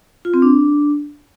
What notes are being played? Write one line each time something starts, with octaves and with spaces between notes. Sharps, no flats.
F4
C4
D4